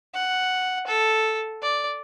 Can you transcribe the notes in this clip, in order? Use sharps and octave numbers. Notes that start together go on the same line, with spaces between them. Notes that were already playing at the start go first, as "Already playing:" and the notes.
F#5
A4
D5